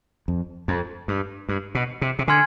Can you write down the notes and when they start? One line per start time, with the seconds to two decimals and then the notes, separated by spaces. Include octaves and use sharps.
0.28 F2
0.68 F2
1.08 G2
1.49 G2
1.75 B2
2.02 C3
2.19 C3
2.28 D3 G#5 C6 F6 G#6